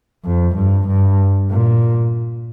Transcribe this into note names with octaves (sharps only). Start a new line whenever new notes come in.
F2
G2
G2
A#2